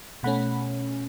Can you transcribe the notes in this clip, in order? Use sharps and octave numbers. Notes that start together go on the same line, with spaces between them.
B2 A3 C#4 F#5 B5